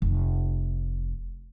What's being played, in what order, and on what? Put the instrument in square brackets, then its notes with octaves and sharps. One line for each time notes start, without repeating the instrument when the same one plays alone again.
[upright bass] F1